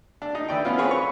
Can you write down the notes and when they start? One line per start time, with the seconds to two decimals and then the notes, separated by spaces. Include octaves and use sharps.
0.22 D4
0.35 D#4
0.48 E3 D5 G5
0.65 B3 C#4 F4
0.78 C4 G#4 B4 C#5
0.91 C#6